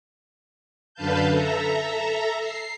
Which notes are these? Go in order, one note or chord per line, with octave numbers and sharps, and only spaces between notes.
F#2 D3 B4 F5 A5 G6
A4 E5 A#5
C7